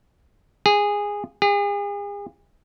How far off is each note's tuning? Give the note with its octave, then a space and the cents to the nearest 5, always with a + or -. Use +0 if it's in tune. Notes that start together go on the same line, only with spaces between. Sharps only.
G#4 -15
G#4 -40